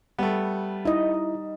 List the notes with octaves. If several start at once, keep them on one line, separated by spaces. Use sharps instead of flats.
G3 A3 B3
D#4 E4 D#5